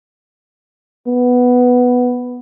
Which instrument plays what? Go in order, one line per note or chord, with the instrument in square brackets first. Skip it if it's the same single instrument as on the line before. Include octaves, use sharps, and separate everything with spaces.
[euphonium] B3